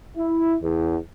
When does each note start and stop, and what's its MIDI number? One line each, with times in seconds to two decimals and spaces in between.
0.17 0.55 64
0.63 0.97 40